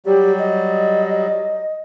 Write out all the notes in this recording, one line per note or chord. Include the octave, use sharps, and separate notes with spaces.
F#3 G3 G4
D#5